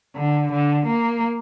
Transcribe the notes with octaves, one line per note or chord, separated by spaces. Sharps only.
D3
D3
A#3